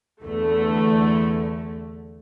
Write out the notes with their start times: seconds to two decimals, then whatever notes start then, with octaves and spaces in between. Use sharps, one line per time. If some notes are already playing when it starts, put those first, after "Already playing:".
0.23 E2 D3 A3